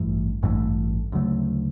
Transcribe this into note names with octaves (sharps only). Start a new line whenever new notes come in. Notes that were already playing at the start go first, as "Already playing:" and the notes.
Already playing: A1 G2 E3 A3
A1 G2 E3 A3
D2 C#3 F#3 A3